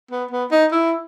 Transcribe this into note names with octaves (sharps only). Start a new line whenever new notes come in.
B3
B3
D#4
E4